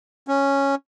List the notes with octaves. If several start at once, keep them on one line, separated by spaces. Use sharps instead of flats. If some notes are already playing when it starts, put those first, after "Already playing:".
C#4